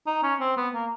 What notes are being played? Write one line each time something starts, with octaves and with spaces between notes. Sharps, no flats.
D#4
C#4
C4
B3
A#3